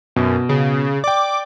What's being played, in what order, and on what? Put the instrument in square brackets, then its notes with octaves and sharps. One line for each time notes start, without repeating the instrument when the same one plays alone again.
[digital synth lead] F#2 [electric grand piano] B2
[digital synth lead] C#3
[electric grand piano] D5 G5 [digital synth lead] D6